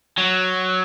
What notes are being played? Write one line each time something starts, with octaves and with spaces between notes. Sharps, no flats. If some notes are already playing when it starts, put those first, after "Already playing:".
F#3